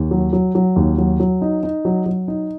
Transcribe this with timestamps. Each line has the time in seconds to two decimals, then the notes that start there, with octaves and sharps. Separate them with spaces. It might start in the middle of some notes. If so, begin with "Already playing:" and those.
Already playing: D#2
0.11 F#3
0.33 F#3
0.55 F#3
0.76 D#2
0.98 F#3
1.20 F#3
1.42 D#4
1.63 D#4
1.85 F#3
2.06 F#3
2.28 D#4